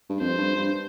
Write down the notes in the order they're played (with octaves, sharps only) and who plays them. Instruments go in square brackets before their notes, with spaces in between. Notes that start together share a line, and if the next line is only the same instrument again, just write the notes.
[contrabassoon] G2
[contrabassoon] F2 [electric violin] C5
[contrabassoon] G2
G2